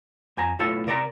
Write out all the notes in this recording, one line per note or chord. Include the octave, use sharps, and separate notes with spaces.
F2 G#5 A#5
B1 A2 F4 A4 E5 A5
C3 A#4 D5 F5 A#5